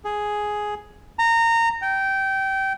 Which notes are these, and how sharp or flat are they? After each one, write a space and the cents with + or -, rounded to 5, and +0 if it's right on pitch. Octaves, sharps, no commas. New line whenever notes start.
G#4 +5
A#5 -20
G5 -20